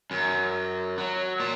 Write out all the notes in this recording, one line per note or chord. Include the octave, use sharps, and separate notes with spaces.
F#2
F#3
A#2